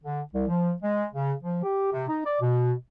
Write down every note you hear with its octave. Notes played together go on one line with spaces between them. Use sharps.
D3
C2
F3
G#3
C#3
F3
G4
C3
D#4
D5
B2